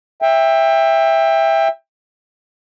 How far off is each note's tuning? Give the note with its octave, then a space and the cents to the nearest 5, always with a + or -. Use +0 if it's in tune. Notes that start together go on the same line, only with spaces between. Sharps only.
E5 +0 G5 +20